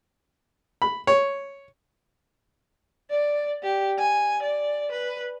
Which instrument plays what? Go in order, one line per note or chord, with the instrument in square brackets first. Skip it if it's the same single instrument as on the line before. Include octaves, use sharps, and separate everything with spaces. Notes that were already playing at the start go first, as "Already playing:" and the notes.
[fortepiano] B5
C#5
[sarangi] D5
G4
G#5
D5
B4